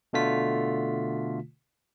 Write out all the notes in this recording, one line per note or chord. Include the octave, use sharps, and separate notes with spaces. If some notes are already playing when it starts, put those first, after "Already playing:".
B2 D3 A3 F4 B6